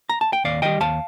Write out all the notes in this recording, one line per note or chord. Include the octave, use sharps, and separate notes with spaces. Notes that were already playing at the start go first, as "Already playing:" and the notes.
A#5
A5
G5
D#2 D5 F5
D#3 G3 D#5 G5
D#2 F5 A5